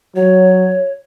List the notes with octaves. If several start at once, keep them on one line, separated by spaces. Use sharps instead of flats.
F#3 C#5